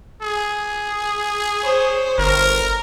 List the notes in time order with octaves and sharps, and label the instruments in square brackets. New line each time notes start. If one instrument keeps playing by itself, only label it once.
[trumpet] G#4
[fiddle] C5 C#5
[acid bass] G1 [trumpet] A#4